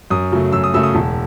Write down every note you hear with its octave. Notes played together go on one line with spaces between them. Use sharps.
F#2 D#6
C#3 F#3 A3
F#2 E6
D#6
C#3 F#3 A3 E6
D#6
E1 A5